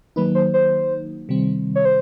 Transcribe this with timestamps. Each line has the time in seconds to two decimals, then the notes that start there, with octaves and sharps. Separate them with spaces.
0.16 D#3 F#3 A#3 D#4 B4
0.35 C5
0.54 C5
1.29 C3 D#3 G3 C4
1.75 C#5
1.85 C5